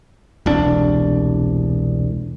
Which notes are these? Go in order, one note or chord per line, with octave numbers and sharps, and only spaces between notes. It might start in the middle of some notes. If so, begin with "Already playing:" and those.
E1 C2 D4